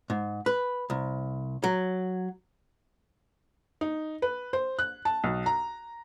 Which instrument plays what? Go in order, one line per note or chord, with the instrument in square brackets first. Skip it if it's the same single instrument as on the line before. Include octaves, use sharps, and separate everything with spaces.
[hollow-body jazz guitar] G#2
B4
C2
F#3
[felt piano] D#4
B4
C5
F#6
A5
B1
A#5